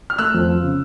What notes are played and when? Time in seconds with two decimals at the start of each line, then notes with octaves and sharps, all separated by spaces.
0.10 F6
0.18 A3 E6 F#6
0.34 F2
0.48 F3
0.63 C#3